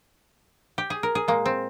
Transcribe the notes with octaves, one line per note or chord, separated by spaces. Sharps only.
G4
G#4
A#4
G#4
A#2 G#3 A#3
C4